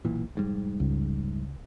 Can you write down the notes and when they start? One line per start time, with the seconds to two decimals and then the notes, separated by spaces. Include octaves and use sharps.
0.05 B1 A#2 E3
0.35 F1 G#2 G3
0.80 C#2